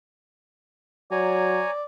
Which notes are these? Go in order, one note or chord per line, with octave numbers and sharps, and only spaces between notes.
F#3 C#5 D5 G#5 A#5